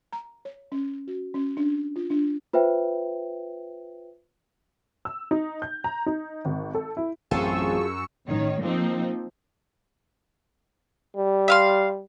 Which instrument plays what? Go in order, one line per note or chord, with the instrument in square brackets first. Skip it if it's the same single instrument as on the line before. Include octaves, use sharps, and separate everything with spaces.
[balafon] A#5
C#5
C#4
F#4
C#4
D4
F4
D4
[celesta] F4 B4 C5 E5 G5
[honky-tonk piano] E6
D#4
G6
A#5
D#4
G#1
A4
E4
[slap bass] A1 C4 [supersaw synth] F#2 C#6 E6 [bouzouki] F4 G#4 A4
[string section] A1 D#3 C#5
F3 A#3 C4 D#4
[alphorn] G3
[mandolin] E5 F5 C6